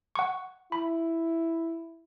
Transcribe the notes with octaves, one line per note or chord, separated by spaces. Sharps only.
F#5 C#6
E4 B5